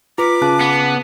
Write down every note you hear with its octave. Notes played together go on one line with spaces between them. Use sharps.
F4 B4 A#5 D6 B6
C#3 A5 F#6
B3